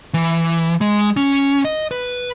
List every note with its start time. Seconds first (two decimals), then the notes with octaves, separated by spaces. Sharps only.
0.14 E3
0.81 G#3
1.17 C#4
1.65 D#5
1.91 B4